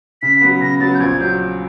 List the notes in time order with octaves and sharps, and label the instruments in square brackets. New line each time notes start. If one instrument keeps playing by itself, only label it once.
[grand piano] C#3 [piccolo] B6
[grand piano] F#3 B3
[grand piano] C#3 [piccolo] A#6
[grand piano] F#3 B3 [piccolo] A6
[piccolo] G6
[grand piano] A#1 [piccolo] G#6
[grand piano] F#3 [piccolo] G6